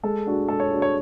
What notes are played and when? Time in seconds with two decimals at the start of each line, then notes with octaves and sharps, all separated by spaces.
0.03 G#3 A4
0.27 D4 F#4
0.48 G#3 A4
0.60 C#5
0.71 D4 F#4
0.82 C#5